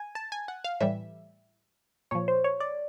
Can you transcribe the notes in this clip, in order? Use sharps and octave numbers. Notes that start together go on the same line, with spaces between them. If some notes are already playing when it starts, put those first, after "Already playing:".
Already playing: G#5
A5
G#5
F#5
F5
A2 E3 G3 E5
A#2 F3 C#5
C5
C#5
D5